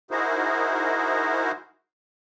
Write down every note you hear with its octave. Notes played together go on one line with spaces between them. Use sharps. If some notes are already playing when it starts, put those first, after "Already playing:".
D#4 E4 F#4 G#4 A#4 C5